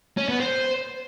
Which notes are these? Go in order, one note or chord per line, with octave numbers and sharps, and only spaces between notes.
C#4
B3
C5